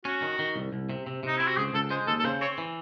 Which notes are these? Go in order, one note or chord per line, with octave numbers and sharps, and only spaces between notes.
C#4 F#4
D#3
D#3
C2
C2
C3
C3
C3 D#4
C4 E4
F#4
C#2 G#4
C#2 A4
G#3 C5
D#2 A4
A4
C#3 C5
C4 C#5
E3